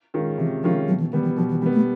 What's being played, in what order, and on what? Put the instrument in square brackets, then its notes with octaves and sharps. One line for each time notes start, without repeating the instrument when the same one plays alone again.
[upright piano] D#3 G#3 C#4 F4
[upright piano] C3 [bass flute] E3
[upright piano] D#3 G#3 C#4 F4 [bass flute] F3
[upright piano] B2 [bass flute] F#3
[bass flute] E3
[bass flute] D#3 [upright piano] G3 B3
[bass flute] E3
[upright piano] B2 [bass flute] F3
[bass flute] E3
[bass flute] E3 [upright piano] G3 B3
[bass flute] A3